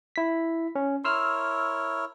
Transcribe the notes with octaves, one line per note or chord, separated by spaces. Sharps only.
E4 B6
C#4
E4 A#4 C#5 C6 E6 F6